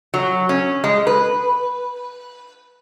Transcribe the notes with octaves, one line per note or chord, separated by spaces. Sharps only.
F#3
C#4
G#3
B4